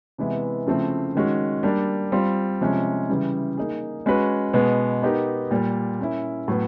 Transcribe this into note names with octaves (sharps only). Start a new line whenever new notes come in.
C3 E3 G#3 B3 E4
C#3 F3 A3 C4 E4
D#3 G#3 C#4 F#4
G3 A#3 D4
G3 C4 F4
C3 F3 G#3 C#4
C#3 E3 G3
A#3 D#4 G#4
G#3 C#4 F#4 B4
B2 G#3 B3
B3 D#4 G4 A#4
A#2 G3 A#3
A#3 C#4 E4
A2 F#3 B3